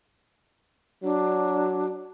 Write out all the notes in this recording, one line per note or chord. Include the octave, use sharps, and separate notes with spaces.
F#3 D4